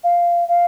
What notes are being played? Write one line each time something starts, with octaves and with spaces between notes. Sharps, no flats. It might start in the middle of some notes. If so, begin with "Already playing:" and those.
F5
F5